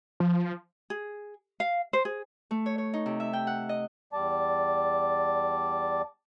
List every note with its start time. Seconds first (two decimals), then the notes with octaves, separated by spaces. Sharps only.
0.20 F3
0.90 G#4
1.60 F5
1.93 C5
2.05 G#4
2.51 A3
2.66 C#5
2.78 C#5
2.93 D#4
3.06 C3
3.20 E5
3.33 G5
3.47 F#5
3.69 D#5
4.13 E2 G3 D5 A5